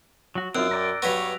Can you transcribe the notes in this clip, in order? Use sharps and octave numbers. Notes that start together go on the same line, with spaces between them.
F#3 F#4
F#2 C4 D#4 F4 E6 F#6 D7
A#4 D5 G5
G2 F#3 B3 C#6 A#6 B6 F7